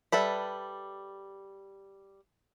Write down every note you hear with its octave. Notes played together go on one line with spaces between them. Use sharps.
G3 A4 B4 E5